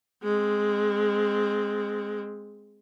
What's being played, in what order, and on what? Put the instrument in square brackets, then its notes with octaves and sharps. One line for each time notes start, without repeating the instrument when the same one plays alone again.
[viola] G#3 C4